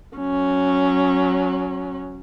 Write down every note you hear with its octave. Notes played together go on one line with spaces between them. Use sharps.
F#3 C#4